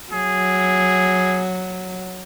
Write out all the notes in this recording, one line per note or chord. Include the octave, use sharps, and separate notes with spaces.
F#3 G#4